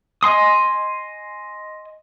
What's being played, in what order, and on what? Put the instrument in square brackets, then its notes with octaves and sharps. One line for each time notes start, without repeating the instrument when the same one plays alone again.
[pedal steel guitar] D#5 G#5 C6 D#6